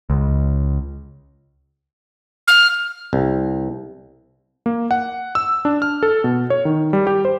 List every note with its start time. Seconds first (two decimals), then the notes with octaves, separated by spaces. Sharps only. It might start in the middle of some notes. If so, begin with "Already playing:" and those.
0.10 C#2
2.48 F6
3.13 C2
4.66 A#3
4.91 F#5
5.35 E6
5.65 D4
5.82 F6
6.03 A4
6.24 B2
6.50 C#5
6.65 D#3
6.93 G3
7.07 G4
7.25 C5